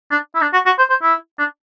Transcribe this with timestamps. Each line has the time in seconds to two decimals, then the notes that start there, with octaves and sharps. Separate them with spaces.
0.11 D4
0.35 E4
0.41 D4
0.53 F#4
0.66 F#4
0.78 C5
0.90 C5
1.02 E4
1.39 D4